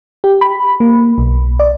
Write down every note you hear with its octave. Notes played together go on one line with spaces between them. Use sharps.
G4
B5
A#3
B1
D5